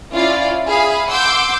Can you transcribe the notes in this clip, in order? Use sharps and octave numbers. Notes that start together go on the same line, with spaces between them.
C#4 E4 F4 D5 F5
G#4 E5 F5 B5
F#5 C6 D6 E6 G6